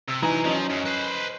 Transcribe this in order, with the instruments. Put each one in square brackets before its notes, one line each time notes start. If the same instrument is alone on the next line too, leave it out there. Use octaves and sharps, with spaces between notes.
[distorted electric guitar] C3 [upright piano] E6
[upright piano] E3 D#4 A#5 [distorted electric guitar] F#4 G#5
[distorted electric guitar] F3 [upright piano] F#3 C#4 D#5
[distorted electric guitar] F#2
B4 C5